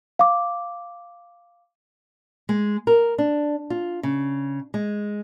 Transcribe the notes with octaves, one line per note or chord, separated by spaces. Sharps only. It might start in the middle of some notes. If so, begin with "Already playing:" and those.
F5 D6
G#3
A#4
D4
F4
C#3
G#3